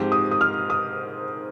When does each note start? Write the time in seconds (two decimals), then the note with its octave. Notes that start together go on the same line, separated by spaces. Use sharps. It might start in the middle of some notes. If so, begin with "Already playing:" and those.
Already playing: G#2 F3 C4 G4 C5
0.12 D#6
0.31 D#6
0.41 F6
0.70 D#6